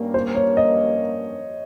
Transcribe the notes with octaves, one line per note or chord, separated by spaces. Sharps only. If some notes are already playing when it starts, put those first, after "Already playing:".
Already playing: G2 G3 A#3 C#4
C5
C#5
D#5